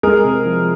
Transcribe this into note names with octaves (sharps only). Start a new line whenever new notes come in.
G#3 G#4 A#4
C3
F3